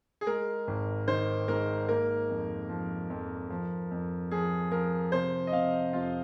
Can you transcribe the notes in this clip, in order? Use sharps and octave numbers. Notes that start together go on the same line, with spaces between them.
G#4
G#3 A#4
G#1
D#3 C5
G#2 A#4
A#3 A#4
F2
F3
F2
F3
F2
F3 G#4
F3 A#4
C3 C5
D#5
C3 F5
F2 F4